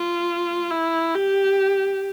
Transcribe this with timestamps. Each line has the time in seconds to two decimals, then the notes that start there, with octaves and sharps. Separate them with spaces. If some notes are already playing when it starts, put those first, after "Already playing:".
Already playing: F4
0.71 E4
1.15 G4